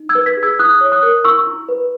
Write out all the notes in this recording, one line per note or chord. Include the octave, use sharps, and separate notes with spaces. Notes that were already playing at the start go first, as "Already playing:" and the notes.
Already playing: D#4
E6 G#6
B4
G#6 B6
G#4
E6 G#6
E4 D#6 F#6
C#5
D#6 F#6
A#4
E4 C#6 E6
E4
B4